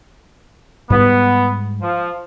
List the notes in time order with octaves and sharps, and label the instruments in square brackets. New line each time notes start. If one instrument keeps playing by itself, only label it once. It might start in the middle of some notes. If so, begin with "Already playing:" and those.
[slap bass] G#2 G3 G#3 [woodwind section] B3
[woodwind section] F3